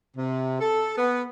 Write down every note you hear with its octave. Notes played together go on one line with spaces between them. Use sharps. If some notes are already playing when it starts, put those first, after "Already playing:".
C3
A4
B3